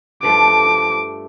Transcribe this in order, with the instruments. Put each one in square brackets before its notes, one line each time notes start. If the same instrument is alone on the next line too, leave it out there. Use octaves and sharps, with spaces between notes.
[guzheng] G2 F3 A3 [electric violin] D6